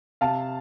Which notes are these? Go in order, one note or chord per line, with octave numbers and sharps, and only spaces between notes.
C3 F5 A5